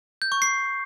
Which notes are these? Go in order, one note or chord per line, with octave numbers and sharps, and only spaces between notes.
G6
C#6
C7